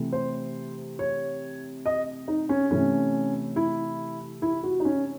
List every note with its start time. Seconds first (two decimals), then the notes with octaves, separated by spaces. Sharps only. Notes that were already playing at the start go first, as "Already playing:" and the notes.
Already playing: C3 E3 A3
0.12 C5
0.99 C#5
1.86 D#5
2.28 D#4
2.49 C#4
2.71 C3 E3 A3 C#4
3.56 E4
4.42 E4
4.64 F#4
4.80 D#4
4.85 C#4